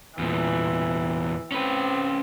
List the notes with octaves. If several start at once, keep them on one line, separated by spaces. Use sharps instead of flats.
E2 A#2 E3
C4 C#4 B4